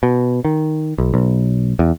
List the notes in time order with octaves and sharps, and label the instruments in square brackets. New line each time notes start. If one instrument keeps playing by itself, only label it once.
[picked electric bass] B2
D#3
B1
B1
E2